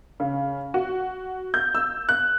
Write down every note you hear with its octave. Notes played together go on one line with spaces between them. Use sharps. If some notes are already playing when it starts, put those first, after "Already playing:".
C#3
F#4
G6
E6
F#6